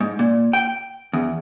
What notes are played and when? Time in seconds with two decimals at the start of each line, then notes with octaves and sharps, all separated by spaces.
0.01 G#2
0.19 A#2
0.53 G5
1.13 E2